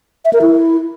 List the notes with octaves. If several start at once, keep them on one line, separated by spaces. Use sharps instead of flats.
E5
A#4
E4